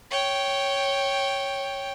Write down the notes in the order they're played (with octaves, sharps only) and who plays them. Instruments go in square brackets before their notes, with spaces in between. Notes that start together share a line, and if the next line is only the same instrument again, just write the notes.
[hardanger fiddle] C#5 G5